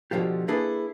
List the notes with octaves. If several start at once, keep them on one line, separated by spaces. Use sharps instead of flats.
B2 D3 F3 F4 G4
A#3 D4 E4 G#4 A4 B4